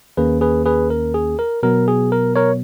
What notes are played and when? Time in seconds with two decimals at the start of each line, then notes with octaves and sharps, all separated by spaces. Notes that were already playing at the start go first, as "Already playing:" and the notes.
0.17 D#2 D#3 A#3 C#4 G#4 B4
0.41 G#4 B4
0.65 G#4 B4
0.90 A#4
1.14 G#4
1.39 A#4
1.63 B2 F#3 B3 A#4
1.88 G#4
2.12 A#4
2.36 A#4 C#5